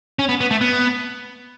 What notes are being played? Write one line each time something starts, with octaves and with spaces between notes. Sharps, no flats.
C#4
B3
B3
A3
B3